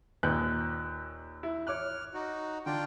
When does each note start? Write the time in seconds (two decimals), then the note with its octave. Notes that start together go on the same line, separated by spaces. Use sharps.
0.23 D#2 A#2 F#6 G6
1.43 E4
1.67 C#5 D6 F6 F#6
2.14 D#4 F#4
2.66 D3 D4 F4 G5